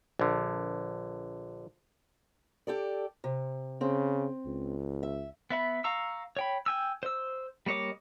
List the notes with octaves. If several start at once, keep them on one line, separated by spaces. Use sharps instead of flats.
A#1 D3
G4 A4 D5
C3
C#3 C4
C#2
E5
B3 E5 B5
F5 A#5 C#6 E6
C#5 G5 B5
G5 G#5 E6
C5 E6
G3 A#3 C#5 D#5 D6